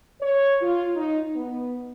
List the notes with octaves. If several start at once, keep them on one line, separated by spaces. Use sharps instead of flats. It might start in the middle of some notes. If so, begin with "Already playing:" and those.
C#5
F4
D#4
B3